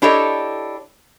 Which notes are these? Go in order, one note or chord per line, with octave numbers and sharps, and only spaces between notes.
D4 E4 G4 A4 C#5 D#5